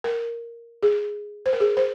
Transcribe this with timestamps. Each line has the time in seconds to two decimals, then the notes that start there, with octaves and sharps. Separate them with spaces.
0.04 A#4
0.83 G#4
1.46 C5
1.53 A#4
1.60 G#4
1.77 C5